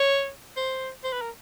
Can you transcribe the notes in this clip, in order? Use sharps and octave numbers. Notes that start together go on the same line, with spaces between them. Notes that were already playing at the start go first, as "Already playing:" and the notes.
Already playing: C#5
C5
C5
B4
A#4